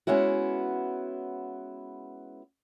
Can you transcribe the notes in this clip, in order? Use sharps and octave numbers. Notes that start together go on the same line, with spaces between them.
G#3 B3 C#4 E4 F#4